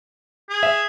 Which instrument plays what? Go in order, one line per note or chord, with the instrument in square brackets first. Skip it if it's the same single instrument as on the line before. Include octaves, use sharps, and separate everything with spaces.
[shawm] G#4
[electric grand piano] E5